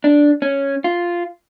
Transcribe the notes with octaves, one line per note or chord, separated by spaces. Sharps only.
D4
C#4
F4